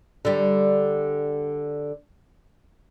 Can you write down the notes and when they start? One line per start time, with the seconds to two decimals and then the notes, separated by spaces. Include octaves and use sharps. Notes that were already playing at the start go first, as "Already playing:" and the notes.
0.25 D3 G3